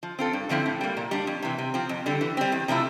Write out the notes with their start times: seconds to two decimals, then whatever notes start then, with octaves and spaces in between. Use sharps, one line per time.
0.03 F3
0.19 C4 F4 A4
0.33 G2
0.49 D3 F3 C4 E4
0.66 A2
0.81 G3 A#3
0.97 A#2
1.11 G3 D4
1.27 F2
1.42 C3 E3
1.58 C3
1.74 F3 C4
1.89 F2
2.06 D3 G3
2.21 E3
2.37 G3 C4
2.52 E2
2.68 C3 F3 A3 E4